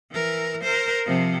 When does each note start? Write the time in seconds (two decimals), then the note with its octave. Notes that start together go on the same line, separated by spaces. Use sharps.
0.11 E3 A#4
0.63 A#4 C5
1.06 C3 F3